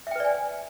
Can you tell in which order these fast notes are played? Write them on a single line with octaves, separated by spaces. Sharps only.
E5 G5 B4 D5 G#5